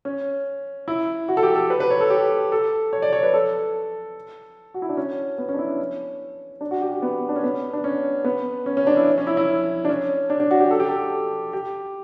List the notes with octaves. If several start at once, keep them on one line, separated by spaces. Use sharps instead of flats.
C#4
E4
F#4
A4
G4
A4
B4
B4
C#5
A4
G4
A4
C#5
D5
C#5
B4
A4
F#4
E4
D4
C#4
B3
C#4
D4
E4
C#4
D4
F#4
G4
F#4
B3
D4
C#4
B3
D4
C#4
B3
C#4
C#4
D4
E4
C#4
E4
E4
D4
C#4
D4
D4
F#4
G4
A4
G4
A4
G4